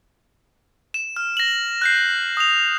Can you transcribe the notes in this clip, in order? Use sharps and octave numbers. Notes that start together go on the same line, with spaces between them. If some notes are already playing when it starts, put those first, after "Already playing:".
E7
F6
A#6 F#7
F#6 G6 C7
D#6 F7